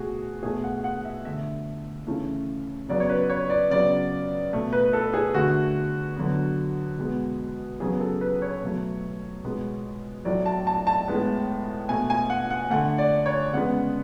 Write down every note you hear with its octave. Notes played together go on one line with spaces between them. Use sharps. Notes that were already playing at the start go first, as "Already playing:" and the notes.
Already playing: B2 A3 F#4 G#4
B2 A3 G#4
F#5
F#5
E5
D3 A3 E5
C#3 E3 A3
C#3 F#3 B3 D5
C#5
B4
C#5
D5
C#3 F#3 B3 D5
B2 A3
B4
A4
G#4
D3 A3 F#4
D3 F#3 B3
B2 G#3 B3
C#3 F#3 B3 G#4
A4
B4
C#5
B2 F#3 A3
B2 G#3 B3
A2 F#3 A3 D5
A5
A5
A5
A2 G#3 B3
B2 A3 G#5
G#5
F#5
F#5
D3 A3 F#5
D5
C#5
C#3 G#3 B3 F#5